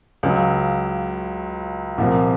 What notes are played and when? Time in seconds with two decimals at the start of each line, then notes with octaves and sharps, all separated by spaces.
0.23 C#2 C#3 F#3
1.98 C2 A#2 F3 A#3